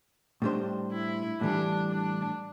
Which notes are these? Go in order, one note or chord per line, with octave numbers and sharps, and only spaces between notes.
A2 G3 D4 C5
E4
A2 E3 G3 D4
D4